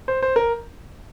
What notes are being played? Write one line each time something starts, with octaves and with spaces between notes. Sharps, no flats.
C5
C5
A#4